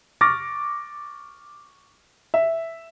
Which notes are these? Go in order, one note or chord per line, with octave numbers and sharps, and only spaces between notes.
C#6 D6 F6 A6 A#6
E5